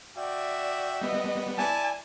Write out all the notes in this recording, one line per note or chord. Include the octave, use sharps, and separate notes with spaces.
F#4 D5 E5 G5
G3 B3 D#5
E4 D5 G#5 A5